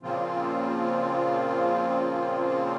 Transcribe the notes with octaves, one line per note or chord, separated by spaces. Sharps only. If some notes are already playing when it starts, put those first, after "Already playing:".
A#2 C#3 F3 A#3 C4 F4